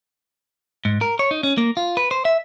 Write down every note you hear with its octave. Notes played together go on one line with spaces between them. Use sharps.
G#2
A#4
C#5
D#4
C#4
A#3
F4
B4
C5
E5